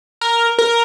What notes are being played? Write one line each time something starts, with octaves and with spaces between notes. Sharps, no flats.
A#4
A#4